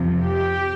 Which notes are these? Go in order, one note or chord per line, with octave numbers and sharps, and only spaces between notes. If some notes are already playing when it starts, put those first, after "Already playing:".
Already playing: F2 C3 F3
G4